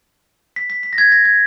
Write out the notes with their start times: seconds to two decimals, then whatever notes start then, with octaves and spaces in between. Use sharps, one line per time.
0.56 B6
0.70 B6
0.83 B6
0.93 A#6
0.98 G#6
1.12 A#6
1.25 G#6